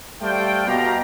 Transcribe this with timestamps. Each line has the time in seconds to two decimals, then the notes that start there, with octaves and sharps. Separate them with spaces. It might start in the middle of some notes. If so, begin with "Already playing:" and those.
0.22 G3 A3 C5 D5 F5 G5
0.67 B2 G4 F5 A#5